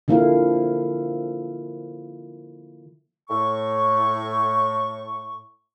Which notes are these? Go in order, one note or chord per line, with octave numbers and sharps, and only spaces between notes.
D3 F3 A#3 E4 A4 F5
A2 C#6